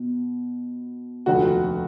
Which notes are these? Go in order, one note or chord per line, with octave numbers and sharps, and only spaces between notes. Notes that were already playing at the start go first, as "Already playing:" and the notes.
Already playing: B2
F1 D#2 D3 F#4